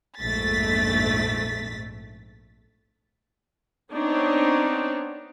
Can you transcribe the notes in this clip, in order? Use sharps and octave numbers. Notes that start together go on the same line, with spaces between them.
A#1 F2 G#2 A3 A6 B6
B3 C4 D4 D#4 C#5